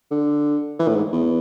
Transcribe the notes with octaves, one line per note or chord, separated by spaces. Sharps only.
D3
E3
A2
G#2
E2